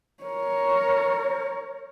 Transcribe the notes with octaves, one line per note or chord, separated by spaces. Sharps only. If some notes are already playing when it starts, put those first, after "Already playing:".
A#4 C#5